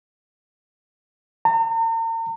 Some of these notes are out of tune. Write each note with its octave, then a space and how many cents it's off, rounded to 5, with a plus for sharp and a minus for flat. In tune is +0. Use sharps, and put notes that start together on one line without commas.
A#5 -45